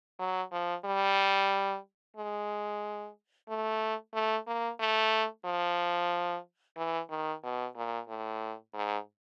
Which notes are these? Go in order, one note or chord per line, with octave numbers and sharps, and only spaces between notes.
F#3
F3
G3
G#3
A3
A3
A#3
A3
F3
E3
D#3
B2
A#2
A2
G#2